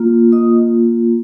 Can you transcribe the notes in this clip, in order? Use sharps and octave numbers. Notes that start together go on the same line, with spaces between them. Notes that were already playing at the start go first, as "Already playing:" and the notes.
Already playing: A#3 F4
D#5 D#6